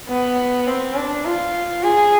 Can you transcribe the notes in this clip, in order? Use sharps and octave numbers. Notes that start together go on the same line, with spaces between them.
B3
C4
D4
F4
G#4